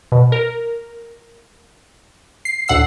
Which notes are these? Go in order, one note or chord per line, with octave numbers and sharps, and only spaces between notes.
B2
A#4
C7
D2 A2 F#5 E6 C7